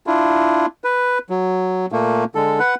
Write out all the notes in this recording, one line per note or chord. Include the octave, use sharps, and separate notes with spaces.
D4 E4 F4
B4
F#3
A#2 A3 A#3
D3 G#3 A4
B4 F#5